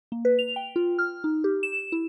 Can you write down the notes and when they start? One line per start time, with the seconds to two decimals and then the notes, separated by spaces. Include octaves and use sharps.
0.12 A#3
0.25 B4
0.39 F7
0.56 G5
0.76 F4
0.99 F6
1.24 D#4
1.44 G4
1.63 E7
1.92 E4